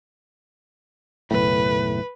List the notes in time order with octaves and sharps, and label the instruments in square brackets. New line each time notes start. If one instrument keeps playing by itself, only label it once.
[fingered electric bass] F#1 B1 A2 [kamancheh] B4